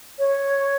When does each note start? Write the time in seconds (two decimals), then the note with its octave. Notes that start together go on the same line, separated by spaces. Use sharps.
0.19 C#5